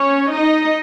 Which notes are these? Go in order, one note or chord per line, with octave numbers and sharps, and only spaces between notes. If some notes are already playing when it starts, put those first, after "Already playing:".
Already playing: C#4 C#5
D#4 D#5